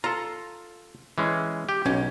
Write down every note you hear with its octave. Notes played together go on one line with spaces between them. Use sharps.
F4 A4 A#5
E3 G#3 C#4
G4
B1 C#4